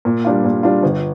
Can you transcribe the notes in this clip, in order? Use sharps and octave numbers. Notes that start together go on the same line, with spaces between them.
A#2
G3 D4 F4
A#2
G3 D4 F4
G1